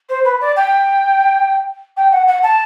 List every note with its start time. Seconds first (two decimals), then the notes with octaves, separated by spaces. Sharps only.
0.09 C5
0.24 B4
0.41 D5
0.56 G5
1.97 G5
2.11 F#5
2.27 F#5
2.43 A5